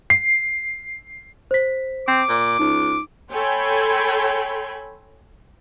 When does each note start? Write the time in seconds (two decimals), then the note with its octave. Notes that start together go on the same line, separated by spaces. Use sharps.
0.10 C7
1.51 C5 B6
2.08 C4 D6
2.28 A#2
2.59 C#2 D#4
3.32 A4 C#5 G5 G#5 B5 C6